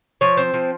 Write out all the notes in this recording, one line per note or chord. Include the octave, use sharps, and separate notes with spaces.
F3 C#5
C4
F3